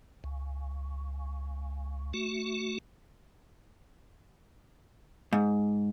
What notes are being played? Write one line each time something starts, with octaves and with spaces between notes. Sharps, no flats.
C#2
A3 F#4
G#2